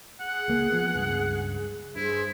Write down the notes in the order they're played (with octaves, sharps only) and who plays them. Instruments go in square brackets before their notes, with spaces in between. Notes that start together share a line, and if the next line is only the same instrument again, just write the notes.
[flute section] G#4 [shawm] F#5
[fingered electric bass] C#2 A#3
F3 B3
C#2 G2
[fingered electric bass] G2 [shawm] E4 [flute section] G#4 C5